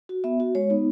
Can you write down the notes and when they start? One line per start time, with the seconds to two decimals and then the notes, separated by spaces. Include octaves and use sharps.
0.09 F#4
0.24 B3 E5
0.40 F#4
0.55 G#3 C#5
0.70 B3 D#4